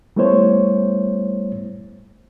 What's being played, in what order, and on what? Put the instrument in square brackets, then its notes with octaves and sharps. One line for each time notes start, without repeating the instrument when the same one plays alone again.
[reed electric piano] G3 A3 B3 E4 C5 C#5